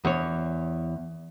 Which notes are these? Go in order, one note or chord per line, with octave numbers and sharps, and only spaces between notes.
E2 C#5